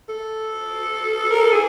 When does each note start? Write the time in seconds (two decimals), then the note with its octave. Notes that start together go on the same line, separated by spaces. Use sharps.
0.09 A4
1.31 A#4
1.41 A4
1.51 G#4